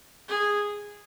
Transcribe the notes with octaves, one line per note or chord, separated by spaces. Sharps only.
G#4